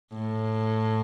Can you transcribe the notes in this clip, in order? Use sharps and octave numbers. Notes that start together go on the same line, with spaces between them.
A2